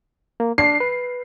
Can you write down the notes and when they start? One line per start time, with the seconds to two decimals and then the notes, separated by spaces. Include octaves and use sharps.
0.40 A#3
0.58 D4 C7
0.80 B4